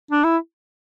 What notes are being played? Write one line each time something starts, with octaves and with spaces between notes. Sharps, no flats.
D4
E4